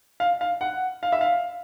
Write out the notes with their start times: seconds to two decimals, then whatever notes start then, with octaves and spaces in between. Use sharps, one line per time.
0.20 F5
0.41 F5
0.61 F#5
1.03 F5
1.12 E5
1.21 F5